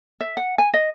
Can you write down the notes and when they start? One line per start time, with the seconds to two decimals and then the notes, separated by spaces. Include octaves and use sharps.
0.21 E5
0.37 F#5
0.58 G#5
0.74 D#5